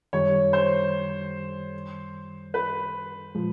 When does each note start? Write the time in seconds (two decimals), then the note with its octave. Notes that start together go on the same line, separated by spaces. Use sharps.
0.13 F#2 D#3 G3 C#5
0.53 C5
2.54 B4
3.35 A#2 F3 G#3